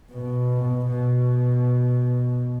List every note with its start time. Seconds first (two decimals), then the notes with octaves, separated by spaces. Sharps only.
0.11 B2
0.85 B2